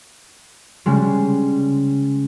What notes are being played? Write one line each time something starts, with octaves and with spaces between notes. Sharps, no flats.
C#3 G3 G#3